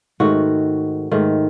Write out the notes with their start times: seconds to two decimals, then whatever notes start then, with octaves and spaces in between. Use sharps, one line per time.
0.20 G#2 D#3 A3 F#4
1.11 G#2 D#3 A3